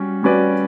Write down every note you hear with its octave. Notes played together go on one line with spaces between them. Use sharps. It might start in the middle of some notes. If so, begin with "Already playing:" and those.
Already playing: G3 C#4 F#4
G3 C#4 F#4 B4 D5